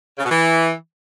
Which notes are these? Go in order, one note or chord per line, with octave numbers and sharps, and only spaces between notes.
C#3
B2
E3